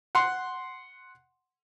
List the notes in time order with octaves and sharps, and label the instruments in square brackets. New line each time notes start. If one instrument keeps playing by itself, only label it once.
[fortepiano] F#5 C6